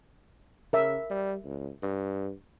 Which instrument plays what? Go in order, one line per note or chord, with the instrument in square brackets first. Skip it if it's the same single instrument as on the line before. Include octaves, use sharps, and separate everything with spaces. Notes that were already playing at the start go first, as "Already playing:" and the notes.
[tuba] C#3 [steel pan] A#4 E5
[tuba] G3
C#2
G2